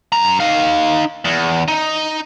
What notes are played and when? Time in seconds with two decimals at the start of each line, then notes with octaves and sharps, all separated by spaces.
0.12 F#2 A#5
0.40 D#4 F5
1.25 E2
1.69 D#4